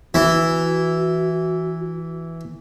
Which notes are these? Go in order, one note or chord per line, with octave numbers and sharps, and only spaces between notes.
E3 F#4